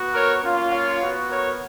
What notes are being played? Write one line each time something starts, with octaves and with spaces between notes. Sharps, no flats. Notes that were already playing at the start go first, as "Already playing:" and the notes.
Already playing: B3 F#4
A#4 C#5
A#3 C#4 F4
C#5 F5
B3 F#4
A#4 C#5